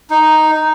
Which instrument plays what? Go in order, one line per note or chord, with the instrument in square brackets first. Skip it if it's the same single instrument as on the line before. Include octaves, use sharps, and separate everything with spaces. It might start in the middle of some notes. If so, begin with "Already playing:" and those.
[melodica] D#4